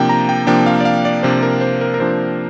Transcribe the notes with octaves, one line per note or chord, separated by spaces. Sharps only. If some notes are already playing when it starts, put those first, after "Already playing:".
Already playing: C3 F3 A#3 D4 G5
A#5
G5
C3 F3 A#3 D4 G5
F5
D5
F5
D5
C3 F3 A#3 D4 C5
A#4
C5
A#4
A#4
C3 F3 A#3 D4 C5